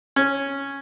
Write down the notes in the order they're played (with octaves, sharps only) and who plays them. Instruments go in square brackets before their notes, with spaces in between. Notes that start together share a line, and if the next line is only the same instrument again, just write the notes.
[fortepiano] C#4